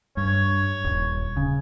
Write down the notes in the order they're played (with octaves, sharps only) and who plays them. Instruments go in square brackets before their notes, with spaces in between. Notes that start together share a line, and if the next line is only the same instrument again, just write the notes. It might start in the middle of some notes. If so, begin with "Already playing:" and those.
[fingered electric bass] G2 [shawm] C#5
[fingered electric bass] D#1
C#3